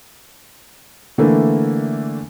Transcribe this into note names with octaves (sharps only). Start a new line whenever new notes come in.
D3 E3 A3 A#3